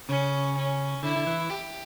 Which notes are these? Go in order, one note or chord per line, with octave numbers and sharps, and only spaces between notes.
C#3 C#4
C#4
D3 E4
D3
E3
G4